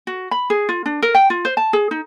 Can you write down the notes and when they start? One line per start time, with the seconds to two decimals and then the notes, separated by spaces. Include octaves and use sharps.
0.07 F#4
0.31 B5
0.50 G#4
0.69 F4
0.86 D4
1.02 A#4
1.15 G5
1.30 F4
1.45 C5
1.57 A5
1.73 G#4
1.91 D#4